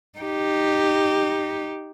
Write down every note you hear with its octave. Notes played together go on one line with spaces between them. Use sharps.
D#4 G4